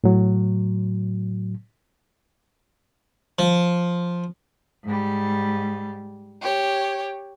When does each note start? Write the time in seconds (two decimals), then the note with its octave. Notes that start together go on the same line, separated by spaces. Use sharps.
0.04 A2 F#3
3.39 F3
4.84 G#2 G3
6.42 G4 C#5